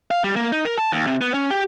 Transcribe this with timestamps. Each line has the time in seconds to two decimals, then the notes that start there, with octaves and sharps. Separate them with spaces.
0.11 F5
0.24 G3
0.36 A#3
0.52 D#4
0.65 A#4
0.78 A5
0.92 D#2
1.07 C3
1.21 B3
1.34 C#4
1.50 G4